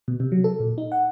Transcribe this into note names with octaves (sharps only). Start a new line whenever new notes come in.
B2
C3
F#3
A4
A#2
D#4
F#5